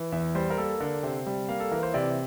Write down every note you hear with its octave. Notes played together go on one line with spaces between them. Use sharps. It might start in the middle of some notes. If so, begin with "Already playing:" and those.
Already playing: E3
E2 E5
G3 C5
A#4
A#3 A4
D3 A#4
C3 C5
G3
A#3 F5
A4
E3 A#4
C5
C3 D5